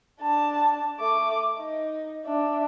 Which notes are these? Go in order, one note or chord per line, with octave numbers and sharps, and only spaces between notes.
D4 A5
A3 D6
D#4
D4 E5